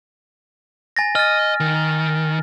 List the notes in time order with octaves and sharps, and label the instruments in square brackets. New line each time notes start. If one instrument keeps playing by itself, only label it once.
[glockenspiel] G#5 A6 A#6
[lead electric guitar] D#5 [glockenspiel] F6 A6
[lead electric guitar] D#3